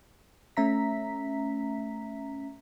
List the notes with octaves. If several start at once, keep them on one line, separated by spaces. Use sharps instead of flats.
A3 C#4 E5 A#5 B6